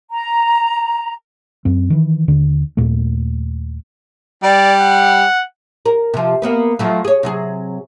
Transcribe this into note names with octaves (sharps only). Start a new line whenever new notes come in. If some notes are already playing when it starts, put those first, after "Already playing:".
A#5
F#2 C4
D#3 E3
D#2 D3
D#2 A#2 A3
G3 D5
F#5
A#4
C3 F3
A#3 B3 B4
F3 F#3 A3
G#4 C#5
C3 F#3 G#4